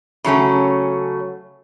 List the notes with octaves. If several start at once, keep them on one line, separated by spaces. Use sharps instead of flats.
C#3 F#3 A3 C#4